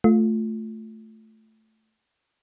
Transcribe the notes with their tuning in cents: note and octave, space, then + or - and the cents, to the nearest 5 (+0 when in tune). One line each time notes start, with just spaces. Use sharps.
A3 +0 F4 +10